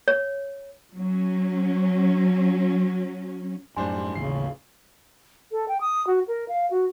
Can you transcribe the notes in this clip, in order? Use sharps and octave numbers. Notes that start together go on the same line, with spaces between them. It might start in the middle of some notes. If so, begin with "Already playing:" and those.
C#5
F#3 C#4
F#2 A2 G3 D4 C5 G#5 C6
A1 D#2 A2 C#3 C7
A4
G5
D#6
F#4
A#4
F5
F#4